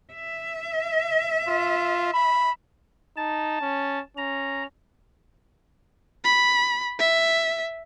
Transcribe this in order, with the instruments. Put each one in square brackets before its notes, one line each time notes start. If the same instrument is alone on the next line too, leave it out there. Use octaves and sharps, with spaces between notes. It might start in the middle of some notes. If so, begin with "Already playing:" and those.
[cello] E5
[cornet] F4
B5
[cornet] D#4 [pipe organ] A5
[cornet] C#4
[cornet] C#4 [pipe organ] A#5
[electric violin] B5
E5